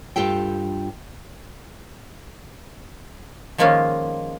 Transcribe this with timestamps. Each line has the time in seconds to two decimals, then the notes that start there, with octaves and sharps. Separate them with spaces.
0.16 G2 F4 G4 A4 G5
3.58 D#3 F3 G#3 A#3 C#4 F4